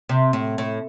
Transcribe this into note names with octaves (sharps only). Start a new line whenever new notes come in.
C3
A2
A2